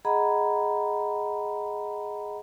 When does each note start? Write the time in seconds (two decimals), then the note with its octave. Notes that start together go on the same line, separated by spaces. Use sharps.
0.05 G#4 D#5 F#5 A#5 B5